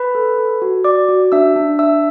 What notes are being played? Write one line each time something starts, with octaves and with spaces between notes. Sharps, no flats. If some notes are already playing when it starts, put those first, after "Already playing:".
Already playing: B4 B5
A4
A4
F#4
F#4 D5 D6
F#4
D4 E5 E6
D4
D4 E5 E6